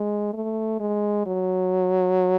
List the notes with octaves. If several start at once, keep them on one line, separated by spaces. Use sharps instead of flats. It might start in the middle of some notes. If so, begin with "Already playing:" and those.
Already playing: G#3
A3
G#3
F#3